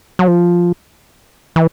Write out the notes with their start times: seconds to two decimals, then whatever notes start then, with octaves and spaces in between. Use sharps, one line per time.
0.19 F#3
0.28 F3
1.56 E3